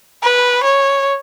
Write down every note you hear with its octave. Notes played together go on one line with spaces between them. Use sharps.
B4
C#5